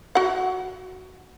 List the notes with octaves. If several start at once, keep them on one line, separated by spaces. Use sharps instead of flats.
F#4 F#5